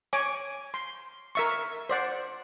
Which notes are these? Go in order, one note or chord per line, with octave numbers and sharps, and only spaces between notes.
C#5 G#5 D6
C6
A#4 E5 C#6
C5 D5 F#5